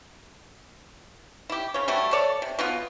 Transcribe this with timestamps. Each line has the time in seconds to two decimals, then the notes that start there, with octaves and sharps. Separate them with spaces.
1.50 E4 G4
1.74 C#3 C#5
1.88 G3 A3 F#4 G4
2.13 A4 C#5 D5
2.42 C3
2.59 B2 B3 F4